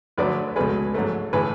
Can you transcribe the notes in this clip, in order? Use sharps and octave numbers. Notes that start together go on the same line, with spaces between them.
D2 D3 F#3 A3 B4 D5
C#2 B2 A3 G#4 B4
G#2 F#3 A3
A2 E3 G#4 B4